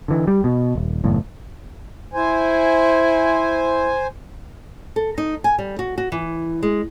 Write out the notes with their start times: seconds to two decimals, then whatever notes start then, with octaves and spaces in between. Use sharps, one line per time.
0.08 D3 E3
0.27 G3
0.44 B2
0.75 D#1
1.04 F#1 E2 A2
2.13 E4 C5 G#5
4.96 A4
5.18 D#4
5.44 G#5
5.59 G3
5.79 F#4
5.98 F#4
6.12 E3
6.63 G#3